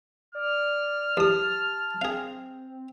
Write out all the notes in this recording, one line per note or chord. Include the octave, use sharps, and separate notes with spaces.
D5 F6
E2 G4 A5 D#6
C4 G#4 F5